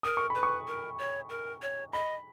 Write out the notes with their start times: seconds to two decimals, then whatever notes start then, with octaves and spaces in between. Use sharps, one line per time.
0.03 A#4 D#6
0.17 C#6
0.30 B4 B5
0.43 C#6
0.68 A#4
0.98 C#5
1.29 A#4
1.62 C#5
1.93 D#5 B5